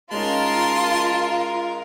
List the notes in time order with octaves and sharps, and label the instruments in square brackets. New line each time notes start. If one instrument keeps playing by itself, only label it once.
[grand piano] G#3 C#4 D#4 [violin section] F4 [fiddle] A#4 [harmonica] A5 C6